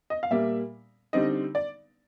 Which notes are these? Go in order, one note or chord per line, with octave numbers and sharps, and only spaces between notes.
D#5
F5
A#2 G3 A#3 E5
D3 G3 C4 D#4 D#5
D5